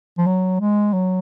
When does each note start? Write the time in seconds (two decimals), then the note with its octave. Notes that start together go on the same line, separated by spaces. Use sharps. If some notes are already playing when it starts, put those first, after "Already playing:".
0.18 F3
0.26 F#3
0.60 G#3
0.93 F#3